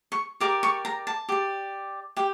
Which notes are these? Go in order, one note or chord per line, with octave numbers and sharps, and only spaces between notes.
C#6
G4 A#4 D5 D6
C#6
A#5
A5
G4 D5
G4 G5